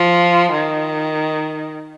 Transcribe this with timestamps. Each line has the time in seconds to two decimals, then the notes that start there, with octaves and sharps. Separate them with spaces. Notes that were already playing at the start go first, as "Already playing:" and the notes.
Already playing: F3
0.52 D#3